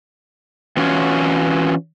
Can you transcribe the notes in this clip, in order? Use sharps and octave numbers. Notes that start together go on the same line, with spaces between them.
E3 C#4 F4 F#4 C#5